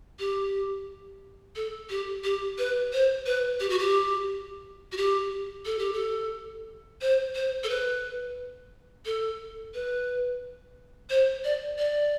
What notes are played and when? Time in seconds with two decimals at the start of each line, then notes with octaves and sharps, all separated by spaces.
0.19 G4
1.56 A4
1.90 G4
2.24 G4
2.58 B4
2.93 C5
3.26 B4
3.60 G4
3.70 F#4
3.79 G4
4.92 F#4
4.97 G4
5.66 A4
5.79 G4
5.93 A4
7.02 C5
7.35 C5
7.64 A4
7.69 B4
9.06 A4
9.74 B4
11.10 C5
11.44 D5
11.78 D5